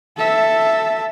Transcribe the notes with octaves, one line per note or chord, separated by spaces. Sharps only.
A4 E5